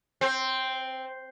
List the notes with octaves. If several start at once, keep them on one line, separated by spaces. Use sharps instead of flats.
C4